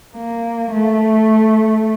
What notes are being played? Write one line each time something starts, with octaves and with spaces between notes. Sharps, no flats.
A#3
A3